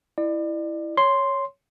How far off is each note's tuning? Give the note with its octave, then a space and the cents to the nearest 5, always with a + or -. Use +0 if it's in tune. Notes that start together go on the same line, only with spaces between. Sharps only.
E4 +5 D5 +35
C#5 +0 C6 +0